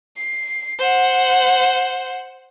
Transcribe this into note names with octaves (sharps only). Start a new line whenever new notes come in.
C7
C5 F#5